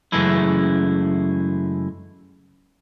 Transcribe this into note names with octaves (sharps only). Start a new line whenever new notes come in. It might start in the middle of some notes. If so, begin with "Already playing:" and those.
F#2 C#3 E3 G#3 A3 E4